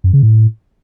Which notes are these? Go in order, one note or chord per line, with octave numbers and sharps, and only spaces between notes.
F#2
C#3
A2